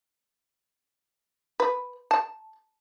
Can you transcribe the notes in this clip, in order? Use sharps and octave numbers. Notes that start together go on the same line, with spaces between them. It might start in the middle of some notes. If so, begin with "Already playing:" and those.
B4
A5